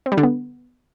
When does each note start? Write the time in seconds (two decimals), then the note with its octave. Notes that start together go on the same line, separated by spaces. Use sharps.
0.06 C4
0.12 G3
0.18 D3
0.23 B3